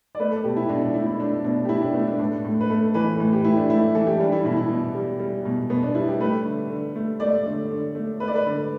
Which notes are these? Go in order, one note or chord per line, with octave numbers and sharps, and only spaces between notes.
D5
A3 B4
A4
B2 G4
E4
B2 D4
D4
A3 E4
E4
A3 D4
B2 D4
G4
B2 E4
D4
A3 B3
D4
A2 D4
A2
B4
A3 A4
E3 B4
A2
G4
A2 E4
D4
A3 E4
E3 A4
G4
G3 D4
E4
B2 E4
E4
B2
G3
G3
B2
B2 B3
D4
G3 E4
G4
A3 B4
D3
D3
A3
A3 D5
D3
D3
A3
A3 B4
D5
B4
D3